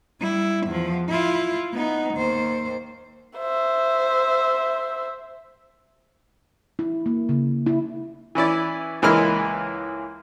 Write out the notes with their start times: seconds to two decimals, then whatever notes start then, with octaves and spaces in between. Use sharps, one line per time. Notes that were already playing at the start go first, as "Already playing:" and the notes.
0.21 G3 E4
0.66 E2 F3
1.09 E4 F4
1.73 B3 D#4
2.14 D#2 C5
3.38 C5 E5
6.79 E4
7.06 A#3
7.29 C#3
7.66 E4
8.35 E3 C#4 E4 D5
9.02 C#2 E3 G#3 A#3 E4 F6